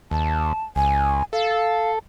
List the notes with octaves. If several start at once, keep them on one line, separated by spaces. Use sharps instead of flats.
D#2 A5
C#2 G#5
A4 F5